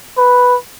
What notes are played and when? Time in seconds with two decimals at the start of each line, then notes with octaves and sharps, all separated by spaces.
0.18 B4